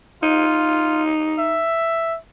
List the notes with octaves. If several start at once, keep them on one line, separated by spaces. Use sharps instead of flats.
D#4 F4
E5